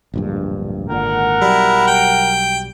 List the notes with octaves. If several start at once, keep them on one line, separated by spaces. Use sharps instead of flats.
D1 A#1 G2
G#1 A#2 D3 A#4 F#5
B1 F#3 G3 E4
G5